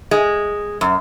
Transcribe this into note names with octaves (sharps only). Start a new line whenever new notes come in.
G#3
F#2